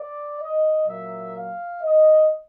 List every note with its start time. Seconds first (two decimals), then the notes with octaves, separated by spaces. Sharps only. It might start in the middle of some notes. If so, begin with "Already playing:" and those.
Already playing: D5
0.41 D#5
0.87 A#2 F#3 A#3 E5
1.36 F5
1.82 D#5